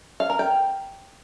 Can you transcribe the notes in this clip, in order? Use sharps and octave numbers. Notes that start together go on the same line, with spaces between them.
F5
A#4
G5